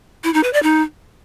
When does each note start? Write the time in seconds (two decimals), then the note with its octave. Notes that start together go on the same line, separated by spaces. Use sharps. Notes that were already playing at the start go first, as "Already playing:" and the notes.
0.24 E4
0.34 D#4
0.43 B4
0.53 D5
0.63 D#4